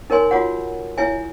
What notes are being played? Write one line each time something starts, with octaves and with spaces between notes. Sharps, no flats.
D#4 A#4 C#5 G#5 C6
F4 F#4 C#5 F#5
E4 C#5 E5 G#5